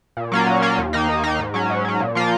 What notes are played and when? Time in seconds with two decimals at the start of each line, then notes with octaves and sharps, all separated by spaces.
0.17 A#2
0.32 F#3 A#3 C#4 F4
0.47 A#2
0.62 F#3 A#3 C#4 F4
0.78 D#2
0.93 D#3 A#3 D#4
1.08 D#2
1.24 D#3 A#3 D#4
1.39 G#2
1.54 F#3 C#4
1.70 G#2
1.85 F#3 C#4
2.00 A#2
2.15 F3 A#3 F4